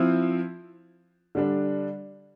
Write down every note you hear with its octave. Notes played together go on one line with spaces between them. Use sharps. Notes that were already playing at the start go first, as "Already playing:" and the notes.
Already playing: F3 C4 E4
D3 G3 D4